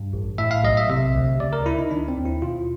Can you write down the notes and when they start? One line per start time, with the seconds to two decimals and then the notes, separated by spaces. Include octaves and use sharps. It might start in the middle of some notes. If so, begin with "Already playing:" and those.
Already playing: G2
0.13 A1
0.38 A2 E5
0.51 F5
0.64 B1 D#5
0.77 E5
0.89 C3 E5
1.15 D2
1.40 C#3 D5
1.53 A#4
1.65 D2 E4
1.79 D#4
1.91 D#3 D4
2.08 C4
2.17 D#2
2.25 E4
2.42 B2 F4